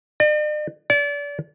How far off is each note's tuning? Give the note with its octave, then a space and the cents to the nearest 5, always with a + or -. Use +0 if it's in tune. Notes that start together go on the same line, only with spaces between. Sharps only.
D5 +45
D5 -35